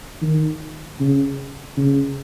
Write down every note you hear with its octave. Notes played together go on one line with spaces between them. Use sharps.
D#3
C#3
C#3